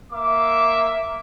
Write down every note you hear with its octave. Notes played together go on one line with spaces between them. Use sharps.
A#3 E5 D6